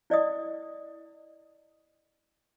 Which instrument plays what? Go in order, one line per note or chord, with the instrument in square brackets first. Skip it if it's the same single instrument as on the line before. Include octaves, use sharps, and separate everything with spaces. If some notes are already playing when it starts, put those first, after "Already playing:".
[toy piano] E4 D5 D#5 D#6